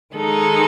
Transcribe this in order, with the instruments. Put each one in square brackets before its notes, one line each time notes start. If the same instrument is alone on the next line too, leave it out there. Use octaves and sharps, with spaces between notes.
[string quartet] D#3 G#3 D#4 A4